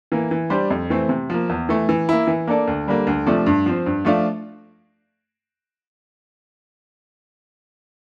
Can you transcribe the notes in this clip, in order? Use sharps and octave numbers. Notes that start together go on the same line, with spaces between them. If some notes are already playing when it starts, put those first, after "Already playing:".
E3 A#3
E3
G3 D4 G4 C5
F2
E3 A3 C4
C3
F3 A#3
E2
E3 A3
E3
A#3 E4
E3
A#3 D4 A4 D5
D2
D3 G3 A#3
D2
C3 F3 A3 D4
G2
F3 C4
G2
F3 A3 D4 F4